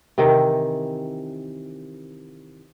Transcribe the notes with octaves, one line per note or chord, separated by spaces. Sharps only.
C3 D#3 E3